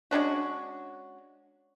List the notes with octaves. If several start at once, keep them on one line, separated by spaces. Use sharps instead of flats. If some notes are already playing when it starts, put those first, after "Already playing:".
G#3 C#4 D4 F#4